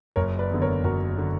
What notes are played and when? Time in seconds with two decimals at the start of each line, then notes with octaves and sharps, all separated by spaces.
0.16 F#1 A#4 C#5
0.39 B4 D5
0.51 E2 D3
0.62 A#4 C#5
0.84 F#1 F#4 A#4
1.18 D3